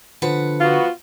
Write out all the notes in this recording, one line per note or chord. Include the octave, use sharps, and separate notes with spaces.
D3 F3 B4 F#5
B3 F4 F#4